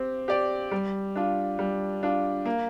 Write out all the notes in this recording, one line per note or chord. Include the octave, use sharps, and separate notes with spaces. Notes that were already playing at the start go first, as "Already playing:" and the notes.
Already playing: C4 G4
G4 D5
G3
D4 F4
G3
D4 F4
A#3